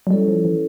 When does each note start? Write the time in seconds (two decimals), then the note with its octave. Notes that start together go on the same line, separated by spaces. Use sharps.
0.07 F#3
0.10 G3 C#4 E4 A4 C#5
0.28 F3
0.45 E3